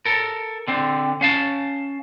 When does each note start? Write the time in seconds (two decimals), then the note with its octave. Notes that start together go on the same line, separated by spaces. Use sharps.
0.06 A4 A#4
0.68 D3 C4
1.21 C#4 F5 A5